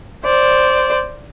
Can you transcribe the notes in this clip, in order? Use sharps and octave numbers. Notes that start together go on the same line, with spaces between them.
C5 D5